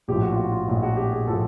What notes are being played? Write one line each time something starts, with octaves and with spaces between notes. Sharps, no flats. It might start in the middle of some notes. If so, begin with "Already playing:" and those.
A#1 A2 F3 G4
F#4
F4
F#4
F4
A#1 A2 F3 F4
F#4
G4
G#4
A2 F3 A4